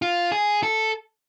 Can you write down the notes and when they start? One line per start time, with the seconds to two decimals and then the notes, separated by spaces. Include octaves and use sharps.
0.02 F4
0.32 G#4
0.63 A4